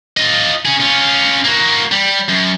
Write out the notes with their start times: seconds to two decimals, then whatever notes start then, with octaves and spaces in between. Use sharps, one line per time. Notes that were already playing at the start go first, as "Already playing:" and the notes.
0.17 F4 D#5
0.65 C#4 G#4
0.80 C#4 F4
1.44 A#3 F#4
1.92 G3
2.28 F#2